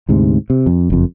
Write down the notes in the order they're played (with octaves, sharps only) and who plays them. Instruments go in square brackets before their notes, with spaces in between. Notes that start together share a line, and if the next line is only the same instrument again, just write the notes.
[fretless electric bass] D2 G#2 C3
C3
F2
F#1 F2